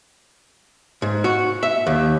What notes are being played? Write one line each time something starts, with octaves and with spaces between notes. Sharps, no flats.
G#2
F#4
E5
D#2